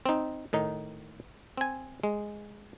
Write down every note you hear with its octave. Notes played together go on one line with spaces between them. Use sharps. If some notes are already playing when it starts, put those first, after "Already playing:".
C4 D#4
A2 D#3 D#4
C4 G#5
G#3